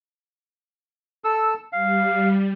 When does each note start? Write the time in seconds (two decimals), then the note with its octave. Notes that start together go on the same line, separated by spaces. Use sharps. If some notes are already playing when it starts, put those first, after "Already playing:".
1.24 A4 E6
1.73 G3 F5